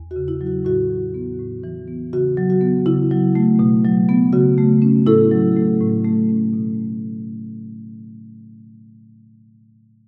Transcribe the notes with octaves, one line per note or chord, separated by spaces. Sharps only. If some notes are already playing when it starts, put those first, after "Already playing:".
Already playing: E2
F#4
C#3
E4
F#3
F#4
A2 F#4
E3
B3
A2
E3
B3
C#3 F#4
F#3
F#4
B3
C#3 E4
F#3
A3
B2
F#3
B3
C#3 F#4
A3
C#4
A2 E4 A4
F#3
A3
A2
A3
C#4
B2